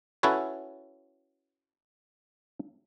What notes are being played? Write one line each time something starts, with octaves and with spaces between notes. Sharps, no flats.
C#4 E4 F#4 A4 B4 C#5